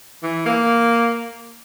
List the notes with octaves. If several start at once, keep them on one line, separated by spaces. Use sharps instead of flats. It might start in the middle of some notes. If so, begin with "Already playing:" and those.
E3
A#3